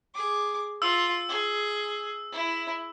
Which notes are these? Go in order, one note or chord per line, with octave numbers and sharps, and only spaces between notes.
G#4 D6
F4 E6
G#4
E4